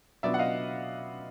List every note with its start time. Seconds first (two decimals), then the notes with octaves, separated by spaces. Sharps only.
0.23 B2 F#3 B3 D4 F4 D5 E5
0.34 F#5
0.39 D#5 F5